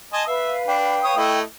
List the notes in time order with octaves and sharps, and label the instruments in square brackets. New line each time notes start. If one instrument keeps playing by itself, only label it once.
[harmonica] D#5 G#5 A5 [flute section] C6
[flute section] B4 F5 [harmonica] E5
[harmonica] D4 [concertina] G5
[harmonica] C#5 D#6
A3 E4 D#5